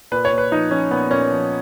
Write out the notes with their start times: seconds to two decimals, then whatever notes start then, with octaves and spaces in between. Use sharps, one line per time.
0.12 A#2 B4
0.25 C#5
0.31 A#2
0.38 B4
0.51 F3 D#4
0.71 F3 C#4
0.91 A#2 B3
1.11 A#2 C#4
1.31 F3